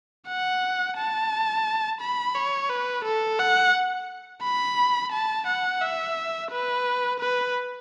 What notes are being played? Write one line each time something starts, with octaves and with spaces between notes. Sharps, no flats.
F#5
A5
B5
C#5
B4
A4
F#5
B5
A5
F#5
E5
B4
B4